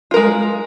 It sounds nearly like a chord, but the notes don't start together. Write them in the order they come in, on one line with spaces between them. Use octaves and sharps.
F4 A#4 G#3